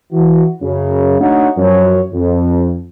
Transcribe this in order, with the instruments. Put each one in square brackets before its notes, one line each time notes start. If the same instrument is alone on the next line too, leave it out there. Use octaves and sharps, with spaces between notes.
[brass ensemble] E3 F#4
F#2 C#3
A3 D4 D#4 F#4 C#5 F#5
F#2 F3 C#5
F2